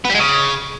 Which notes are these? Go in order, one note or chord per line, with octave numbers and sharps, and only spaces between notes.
B3
G3
G#3
C#3